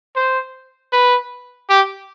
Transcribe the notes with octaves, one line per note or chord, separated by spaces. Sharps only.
C5
B4
G4